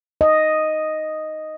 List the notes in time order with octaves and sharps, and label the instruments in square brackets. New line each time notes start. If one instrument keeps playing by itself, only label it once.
[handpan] D#5